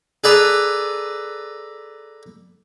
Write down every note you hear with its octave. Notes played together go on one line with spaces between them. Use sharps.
G#4 A4 B4 D5 A#5